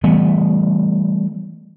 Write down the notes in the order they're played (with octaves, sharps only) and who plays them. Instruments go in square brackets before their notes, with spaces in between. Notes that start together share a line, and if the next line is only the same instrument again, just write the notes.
[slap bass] E3 G3 A3 B3